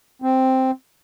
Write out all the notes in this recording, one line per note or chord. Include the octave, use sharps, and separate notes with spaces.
C4